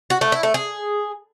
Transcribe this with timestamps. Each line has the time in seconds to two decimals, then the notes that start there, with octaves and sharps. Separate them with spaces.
0.10 F#4
0.21 A3
0.32 E4
0.43 A3
0.54 G#4